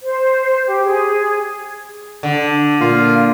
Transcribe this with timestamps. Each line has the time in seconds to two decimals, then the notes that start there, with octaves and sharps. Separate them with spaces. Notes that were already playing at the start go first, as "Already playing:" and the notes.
0.01 C5
0.66 G4
0.86 G#4
2.23 D3
2.81 A#2 F4 F5